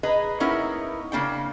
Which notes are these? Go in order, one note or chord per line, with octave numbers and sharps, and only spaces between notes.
G#4 B4 D#5 A#5
A#3 B3 C#4 D#4 E4 A#4
C#3 A#3 D4 G5